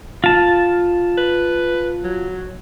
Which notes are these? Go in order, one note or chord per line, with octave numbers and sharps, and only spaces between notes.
F4 A5
B4
F#3